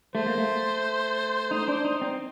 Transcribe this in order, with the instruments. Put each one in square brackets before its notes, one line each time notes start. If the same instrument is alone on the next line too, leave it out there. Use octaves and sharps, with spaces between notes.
[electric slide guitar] A3 [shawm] C5
[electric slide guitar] A#3
A3
D#4
D4
D#4
C4